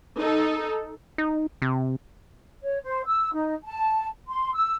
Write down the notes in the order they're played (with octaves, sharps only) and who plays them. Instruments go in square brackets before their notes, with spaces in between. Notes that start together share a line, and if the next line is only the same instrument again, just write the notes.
[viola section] D#4 A4
[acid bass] D#4
C3
[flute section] C#5
C5
E6
D#4
A5
C6
E6